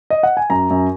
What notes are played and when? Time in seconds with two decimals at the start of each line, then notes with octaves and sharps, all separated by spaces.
0.10 D#5
0.23 F#5
0.37 G#5
0.50 F#2 A#5
0.70 F#2